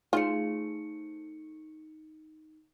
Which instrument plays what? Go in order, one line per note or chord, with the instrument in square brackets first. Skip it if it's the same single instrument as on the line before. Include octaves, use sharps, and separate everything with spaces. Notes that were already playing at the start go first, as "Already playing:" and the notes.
[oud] A3 G#4 C5 [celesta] D#4 C#7 [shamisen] F4